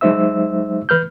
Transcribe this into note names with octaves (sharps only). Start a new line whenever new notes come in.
F#3 G#3 D#4 C5 E5 E6
E3 B4 F6 G6